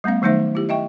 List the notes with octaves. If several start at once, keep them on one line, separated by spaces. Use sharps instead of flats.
G3 A3 B3 C#4 F5
D#3 F#3 A3 D#4 C5 E5
E4 G4
D#5 E5 G5 C#6